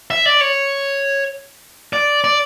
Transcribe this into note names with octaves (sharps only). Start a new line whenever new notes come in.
E5
D5
C#5
D5
D5